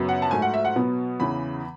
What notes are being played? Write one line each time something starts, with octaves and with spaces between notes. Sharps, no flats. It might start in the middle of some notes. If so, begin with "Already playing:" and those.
Already playing: F#2 C#3 F#3 B3
F#5
A5
G#2 F#3 A3 G#5
F#5
E5
F#5
B2 F#3 B3
E2 C#3 E3 B5